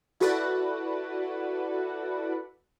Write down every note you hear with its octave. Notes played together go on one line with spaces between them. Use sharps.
E4 F#4 A4 B4 D5 F#5